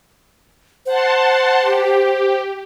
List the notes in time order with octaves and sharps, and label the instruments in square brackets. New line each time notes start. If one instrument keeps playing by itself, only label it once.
[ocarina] C5 [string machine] F#5 A5 C6
[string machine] G4